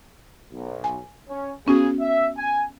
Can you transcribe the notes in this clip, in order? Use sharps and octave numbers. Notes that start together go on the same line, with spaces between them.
B1
G#5
C#4
C#3 B3 C#4 F#4 G#4
E5
G#5